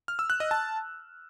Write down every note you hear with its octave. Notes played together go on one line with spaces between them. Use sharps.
F6
E6
F#6
D#5
A5